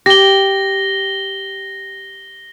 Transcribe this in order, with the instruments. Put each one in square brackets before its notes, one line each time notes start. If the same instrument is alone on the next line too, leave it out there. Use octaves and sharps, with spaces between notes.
[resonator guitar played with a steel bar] G4 [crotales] A#6 G7